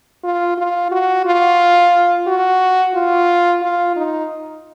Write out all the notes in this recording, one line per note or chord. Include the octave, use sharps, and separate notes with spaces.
F4
F4
F#4
F4
F#4
F4
F4
D#4